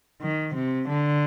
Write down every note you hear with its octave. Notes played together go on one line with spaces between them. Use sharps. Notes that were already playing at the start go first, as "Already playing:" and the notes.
D#3
C3
D3